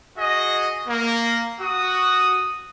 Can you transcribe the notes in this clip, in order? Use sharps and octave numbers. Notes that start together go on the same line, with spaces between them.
F#4 G#4 D#5
A#3
F#4 D#6